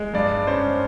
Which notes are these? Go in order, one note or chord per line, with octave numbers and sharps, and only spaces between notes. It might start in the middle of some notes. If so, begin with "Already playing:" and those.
Already playing: G#3
G2 D5
C#4 C5